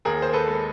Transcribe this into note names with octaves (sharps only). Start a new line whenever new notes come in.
D#2 G#4 A#4
C5
A4 B4
G#3